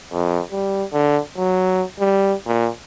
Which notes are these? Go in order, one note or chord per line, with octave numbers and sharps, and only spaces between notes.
F2
G3
D3
F#3
G3
A#2